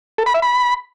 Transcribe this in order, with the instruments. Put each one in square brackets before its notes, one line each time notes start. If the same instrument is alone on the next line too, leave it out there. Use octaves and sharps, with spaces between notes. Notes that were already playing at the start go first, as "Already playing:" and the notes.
[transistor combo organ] A4
B5
E5
B5